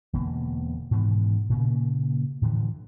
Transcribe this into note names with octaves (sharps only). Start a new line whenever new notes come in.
E1 B2 D3 A#3
G#2 B2 D#3 E3
A#2 C#3 A#3
A2 D3 E3 F3